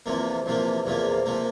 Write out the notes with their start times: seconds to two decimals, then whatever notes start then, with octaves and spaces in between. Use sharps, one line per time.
0.06 E2 C3 F3 A#3
0.46 E2 C3 F3 A#3
0.86 E2 C3 F3 A#3
1.26 C3 F3 A#3